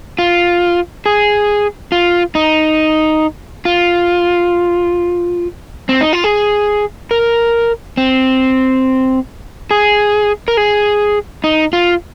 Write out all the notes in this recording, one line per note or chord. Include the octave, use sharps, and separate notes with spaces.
F4
G#4
F4
D#4
F4
C4
D#4
F4
G#4
A#4
C4
G#4
A#4
G#4
D#4
F4